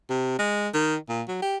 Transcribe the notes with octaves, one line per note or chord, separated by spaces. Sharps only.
C3
G#3
D#3
A#2
F#3
G4